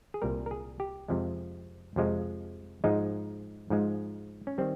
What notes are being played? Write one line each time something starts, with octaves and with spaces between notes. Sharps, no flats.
G#4
C2 A#2 G3 A#4
A#4
G#4
G4
F2 C3 F3 G#3
F2 C3 F3 G#3
G#2 F3 G#3 D#4
G#2 F3 G#3
C#4
D#3 G3 C4